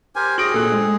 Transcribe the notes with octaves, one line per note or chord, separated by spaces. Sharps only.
G4 A#4 C5 G#5
F#4 G#4 A#6 D7 F#7
A#2 C4 A4 F#6
G#3